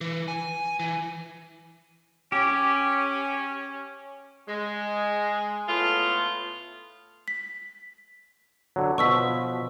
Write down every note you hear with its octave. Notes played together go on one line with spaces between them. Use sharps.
E3
G#5
E3
C#4 G4
G#3
A2 A3 B3 F4
B6
D3 F#3
B2 F3 C#6 E6 B6